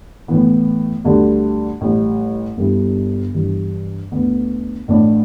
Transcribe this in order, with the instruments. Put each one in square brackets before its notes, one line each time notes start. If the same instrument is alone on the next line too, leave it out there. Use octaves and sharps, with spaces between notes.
[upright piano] A2 E3 B3
D2 D3 G3
A1 A2 G3
G1 G2 G3 E4
G2 E3 G3
D2 D3 B3
A1 A2 A3 D4